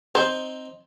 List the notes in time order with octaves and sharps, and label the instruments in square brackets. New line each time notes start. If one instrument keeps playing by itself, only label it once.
[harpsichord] C4 D#4 [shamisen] C5